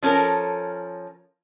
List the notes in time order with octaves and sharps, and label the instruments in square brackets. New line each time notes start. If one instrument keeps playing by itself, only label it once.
[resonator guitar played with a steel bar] F3 C#4 A4 A#4